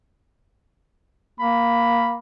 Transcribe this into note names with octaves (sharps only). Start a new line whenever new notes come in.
A#3 B5